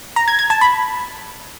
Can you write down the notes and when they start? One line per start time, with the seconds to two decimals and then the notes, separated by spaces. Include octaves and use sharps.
0.16 A#5
0.28 G#6
0.39 G#6
0.50 A5
0.61 B5